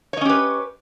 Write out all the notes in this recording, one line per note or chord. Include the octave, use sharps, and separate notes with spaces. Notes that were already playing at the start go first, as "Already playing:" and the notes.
C#4 G4 B4 C#5 D#5